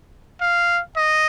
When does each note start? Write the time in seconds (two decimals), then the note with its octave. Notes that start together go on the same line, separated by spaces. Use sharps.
0.42 F5
0.97 D#5